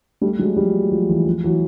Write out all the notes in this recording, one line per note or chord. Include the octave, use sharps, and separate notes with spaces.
G3 A3
F#3 G#3
F3 G3
F3
E3
F3
E3 F#3